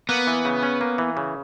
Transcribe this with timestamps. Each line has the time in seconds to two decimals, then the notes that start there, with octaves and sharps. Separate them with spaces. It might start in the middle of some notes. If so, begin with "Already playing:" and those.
0.09 A#3 B3
0.27 E3
0.45 C#3
0.63 C#4
0.81 A#3
0.98 E3
1.17 C#3